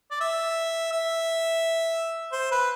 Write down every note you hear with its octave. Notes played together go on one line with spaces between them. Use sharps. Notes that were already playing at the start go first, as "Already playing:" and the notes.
D5
E5
E5
C5
B4